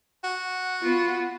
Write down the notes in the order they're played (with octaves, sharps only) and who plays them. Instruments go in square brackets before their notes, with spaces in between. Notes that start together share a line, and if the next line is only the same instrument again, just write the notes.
[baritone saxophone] F#4
[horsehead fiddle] B3 F4